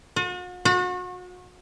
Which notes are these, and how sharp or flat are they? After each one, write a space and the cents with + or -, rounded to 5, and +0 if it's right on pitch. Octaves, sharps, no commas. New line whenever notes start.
F#4 -45
F#4 -35